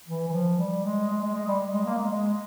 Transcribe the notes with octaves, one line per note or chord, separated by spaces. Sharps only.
E3
E3
F3
G3
G#3
G#3
G#3
G#3
G3
G#3
A#3
G#3
G#3